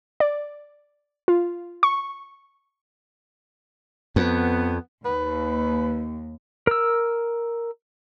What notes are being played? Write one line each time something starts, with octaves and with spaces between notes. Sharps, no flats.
D5
F4
C#6
F2 B3
D#2 B4
A#4 E6